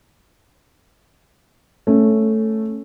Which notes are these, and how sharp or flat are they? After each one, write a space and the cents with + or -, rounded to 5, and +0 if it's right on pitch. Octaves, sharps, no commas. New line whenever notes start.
A3 +0 C#4 +0